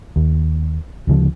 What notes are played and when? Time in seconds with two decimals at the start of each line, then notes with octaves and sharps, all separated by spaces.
0.16 D#2
1.07 D2 C#3 F3